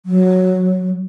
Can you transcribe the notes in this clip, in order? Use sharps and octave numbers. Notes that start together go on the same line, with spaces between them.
F#3